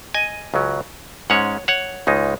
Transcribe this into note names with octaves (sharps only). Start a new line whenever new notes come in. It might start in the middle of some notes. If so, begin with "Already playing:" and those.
D#5 G#5
C#2 C#3 F#3 C#4
G#2 G#3 C#4 C#5 F#5
C#5 F#5
C#2 C#3 G#3 D#4